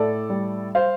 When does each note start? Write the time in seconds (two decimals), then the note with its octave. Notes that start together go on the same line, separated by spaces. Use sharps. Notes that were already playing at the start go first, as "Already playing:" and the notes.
Already playing: A2 A4 D5
0.30 G3
0.75 C5 F5